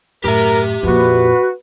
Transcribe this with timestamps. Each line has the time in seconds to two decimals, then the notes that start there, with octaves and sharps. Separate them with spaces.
0.24 F#2 A2 G4 A#4 E5
0.83 F2 A#2 F#4 B4